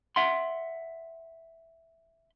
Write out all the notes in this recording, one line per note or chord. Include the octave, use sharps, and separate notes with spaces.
E5 F#5 C6